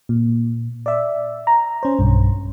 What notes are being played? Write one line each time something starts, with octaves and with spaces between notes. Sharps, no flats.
A#2
D5 E5
A#5
C#4 C5
B1 G2